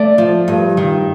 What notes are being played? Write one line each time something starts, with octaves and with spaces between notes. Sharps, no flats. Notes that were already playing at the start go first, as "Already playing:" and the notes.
Already playing: A3 D5
F3
G2
D#3